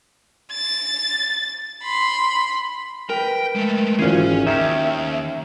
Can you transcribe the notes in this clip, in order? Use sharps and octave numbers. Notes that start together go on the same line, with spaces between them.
A6
B5 C6
A#4 B4 G5
G#3 A3
G#1 E3 C#4 F4 G#4
D#2 D#3 C#4 E5